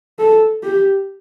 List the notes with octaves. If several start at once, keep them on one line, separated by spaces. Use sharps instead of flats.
A4
G4